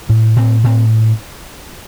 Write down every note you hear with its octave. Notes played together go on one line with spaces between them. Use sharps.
A2
A2 C4
A2 C4